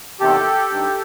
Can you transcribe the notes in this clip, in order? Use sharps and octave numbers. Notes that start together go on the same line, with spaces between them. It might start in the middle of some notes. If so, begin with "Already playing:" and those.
E2 C3 D#3 G4 A4
G2 D#3